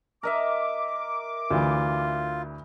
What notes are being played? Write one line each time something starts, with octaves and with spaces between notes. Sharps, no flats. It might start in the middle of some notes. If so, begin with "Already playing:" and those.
A#4 D#5 E5 D6
D2 E3 F4